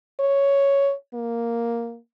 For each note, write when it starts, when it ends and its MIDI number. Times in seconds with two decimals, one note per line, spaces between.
0.20 0.93 73
1.14 1.97 58